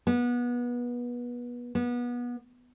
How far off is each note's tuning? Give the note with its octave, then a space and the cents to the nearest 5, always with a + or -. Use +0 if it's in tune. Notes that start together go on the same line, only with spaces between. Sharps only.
B3 -25
B3 -25